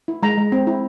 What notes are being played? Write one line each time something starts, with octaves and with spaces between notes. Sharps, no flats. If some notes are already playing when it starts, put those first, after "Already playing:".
E4
G#3 A#5
G#3
C4
E4